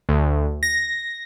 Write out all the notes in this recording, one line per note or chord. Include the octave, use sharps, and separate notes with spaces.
D2
A#6